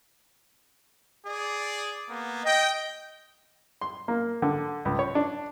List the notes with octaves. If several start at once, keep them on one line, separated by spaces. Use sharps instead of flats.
G#4 D5
A#3 B3
D#5 G5
C6
A#3
D3
C#2
C#5
D4